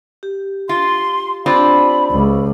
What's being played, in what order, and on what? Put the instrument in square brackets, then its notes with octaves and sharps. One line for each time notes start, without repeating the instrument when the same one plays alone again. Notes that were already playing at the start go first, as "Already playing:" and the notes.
[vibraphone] G4
[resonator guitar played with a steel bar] F4 [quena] C6
[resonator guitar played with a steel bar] C4 D4 F4 [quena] B5
[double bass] C#2